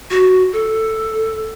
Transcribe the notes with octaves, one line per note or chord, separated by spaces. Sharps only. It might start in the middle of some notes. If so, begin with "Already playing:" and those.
F#4
A4